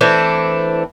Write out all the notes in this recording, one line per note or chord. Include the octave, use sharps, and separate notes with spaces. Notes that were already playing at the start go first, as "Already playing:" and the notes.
E3 A3 C4 D4